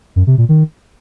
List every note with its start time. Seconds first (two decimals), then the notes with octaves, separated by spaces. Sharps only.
0.16 F#2
0.27 C3
0.38 A#2
0.49 D#3